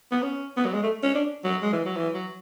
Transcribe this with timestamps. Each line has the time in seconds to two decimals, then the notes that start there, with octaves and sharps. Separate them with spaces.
0.12 B3
0.23 C#4
0.57 B3
0.66 F#3
0.74 G#3
0.83 A3
1.03 C#4
1.15 D4
1.44 F#3
1.62 G#3
1.73 E3
1.85 F#3
1.97 E3
2.15 F#3